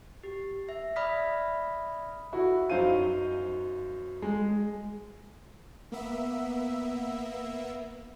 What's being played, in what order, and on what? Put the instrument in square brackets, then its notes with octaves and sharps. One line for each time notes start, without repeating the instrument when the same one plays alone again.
[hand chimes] G4
E5
D5 E5 B5 D#6 F6 B6
[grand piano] E4 F#4
F#2 D#4 C5 F5 D#7
G#3
[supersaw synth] A#3 B3 E5